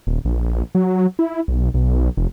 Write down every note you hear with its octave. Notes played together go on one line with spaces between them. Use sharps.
D#1
A#1
F#3
E4
B1
B1
F1